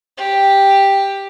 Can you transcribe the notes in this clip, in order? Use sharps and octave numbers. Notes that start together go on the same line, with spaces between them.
G4